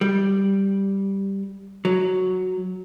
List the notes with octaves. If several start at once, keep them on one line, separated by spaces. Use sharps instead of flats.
G3
F#3